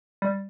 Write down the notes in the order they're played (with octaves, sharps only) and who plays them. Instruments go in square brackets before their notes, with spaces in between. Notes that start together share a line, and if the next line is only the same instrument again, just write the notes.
[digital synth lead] G3